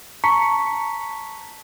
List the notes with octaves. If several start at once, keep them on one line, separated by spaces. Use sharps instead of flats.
A5 A#5 C#6 B6 C#7